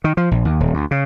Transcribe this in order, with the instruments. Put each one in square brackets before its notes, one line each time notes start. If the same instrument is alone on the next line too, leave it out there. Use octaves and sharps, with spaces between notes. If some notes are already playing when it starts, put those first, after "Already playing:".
[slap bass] D#3
F3
A#1
D#2
D#1
D2
C#3